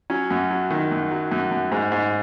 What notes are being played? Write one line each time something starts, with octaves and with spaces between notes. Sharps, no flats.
F#3 C#4
F#2
F#3
D#3
F#2
F#3
F#2
F#2
G#2
G#2